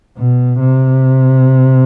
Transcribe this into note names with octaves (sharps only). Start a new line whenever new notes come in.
B2
C3